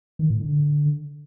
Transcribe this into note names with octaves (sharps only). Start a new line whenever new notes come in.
D#3
A2
D3